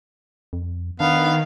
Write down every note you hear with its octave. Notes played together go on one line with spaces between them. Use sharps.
F2
D#3 B3 D4 F5